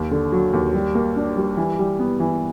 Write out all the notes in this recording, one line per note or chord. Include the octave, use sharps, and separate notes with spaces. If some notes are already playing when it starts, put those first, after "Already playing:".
Already playing: D#2
D3
F#3
D#2
G3
A#3
D4
G3
E3
G3
B3
E3